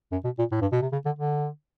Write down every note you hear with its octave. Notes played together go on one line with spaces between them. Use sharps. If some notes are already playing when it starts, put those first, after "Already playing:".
F#2
B2
A#2
A2
G2
B2
C3
C#3
D3
D3